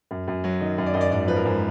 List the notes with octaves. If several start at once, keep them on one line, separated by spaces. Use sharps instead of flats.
F#2
F#2
F#3
D#3 D#5
F#2
D5
F#2 D#5
D5
G#2 D5
F3 B4
A#4
G#2